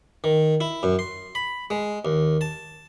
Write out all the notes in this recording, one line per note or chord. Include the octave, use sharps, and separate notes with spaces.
D#3
E4
F#2
C6
B5
G#3
D#2
A5